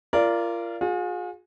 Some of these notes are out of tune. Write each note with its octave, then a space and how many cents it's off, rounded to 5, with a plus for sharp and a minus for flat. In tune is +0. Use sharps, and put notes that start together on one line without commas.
F4 -30 A#4 +0 D5 -10
F4 +45 G#4 +0